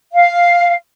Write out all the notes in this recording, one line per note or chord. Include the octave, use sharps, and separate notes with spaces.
F5